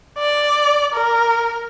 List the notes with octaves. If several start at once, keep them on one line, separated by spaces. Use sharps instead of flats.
D5
A#4